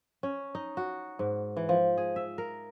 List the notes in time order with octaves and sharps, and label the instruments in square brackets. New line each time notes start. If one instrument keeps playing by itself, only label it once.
[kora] C#4
D#4
F#4
G#2
E3
F3
G#4
E5
A#4